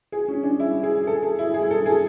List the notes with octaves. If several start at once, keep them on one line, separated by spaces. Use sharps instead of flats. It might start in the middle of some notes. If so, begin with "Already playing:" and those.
G#4
C#4
D4
E4
G#4
A4
G#4
E4
G#4
A4
G#4